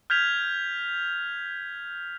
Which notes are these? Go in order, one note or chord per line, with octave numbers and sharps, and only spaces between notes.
F6 G6 G#6 B6 F7